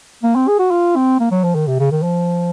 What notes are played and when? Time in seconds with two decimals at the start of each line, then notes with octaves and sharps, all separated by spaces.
0.23 A#3
0.35 C4
0.48 G#4
0.59 F#4
0.71 F4
0.96 C4
1.20 A#3
1.31 F#3
1.44 F3
1.55 D#3
1.67 C3
1.79 C#3
1.91 D#3
2.03 F3